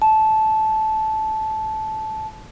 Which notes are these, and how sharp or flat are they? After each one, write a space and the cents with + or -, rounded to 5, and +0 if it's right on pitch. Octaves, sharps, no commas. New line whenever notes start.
A5 -15